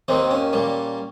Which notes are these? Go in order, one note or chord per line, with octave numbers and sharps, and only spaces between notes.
D#2 D#3 A#3 C4
C#4
A#2 G3 A#3